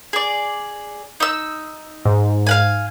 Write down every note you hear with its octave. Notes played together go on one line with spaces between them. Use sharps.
G#4 D5
D#4 E6
G#2
F5 F#5 G#5